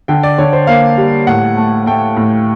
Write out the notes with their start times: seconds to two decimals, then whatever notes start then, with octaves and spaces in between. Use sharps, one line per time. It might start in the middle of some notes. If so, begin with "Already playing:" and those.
0.08 D3 G5
0.23 D5
0.38 D3 C#5
0.53 C5
0.67 A#3 F5
0.98 G3
1.27 A2 F#5
1.57 A3
1.86 A3 G5
2.17 A2